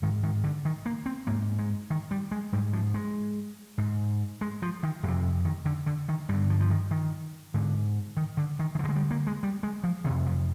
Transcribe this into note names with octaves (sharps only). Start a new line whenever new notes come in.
G#2 D#3
D#3
D3
D#3
A#3
C4
G#2 A#3
G#3
D#3
G3
G#3
G#2 G3
F3
G#3
G#2
G#3
F3
D#3
F2 C3 D3
D#3
D3
D3
D#3
G2 D3 G3
F3
F3
D#3
D#3
G#2 D3
D#3
D3
D#3
D#3
G2 D3 F3
G#3
G3
A#3
G#3
G3
G#3
F3
F2 C3 D#3
F3